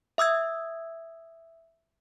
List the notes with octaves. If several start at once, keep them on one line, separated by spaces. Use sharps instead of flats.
E5 D#6 E6 G#6